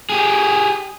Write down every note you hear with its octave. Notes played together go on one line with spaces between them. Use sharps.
G4 G#4